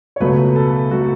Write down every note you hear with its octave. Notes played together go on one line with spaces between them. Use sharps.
C#5
C#2 B2 F#3 A3 B4
A4
B2 F#3 A3 F#4